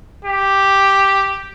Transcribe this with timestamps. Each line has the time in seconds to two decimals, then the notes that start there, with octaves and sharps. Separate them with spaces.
0.25 G4